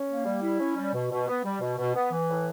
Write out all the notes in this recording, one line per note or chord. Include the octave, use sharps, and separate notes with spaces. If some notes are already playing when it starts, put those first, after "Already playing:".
Already playing: C#4
A#3
G3
E4
C#4
G3
B2
B2
B3
G3
B2
B2
B3
E3
A2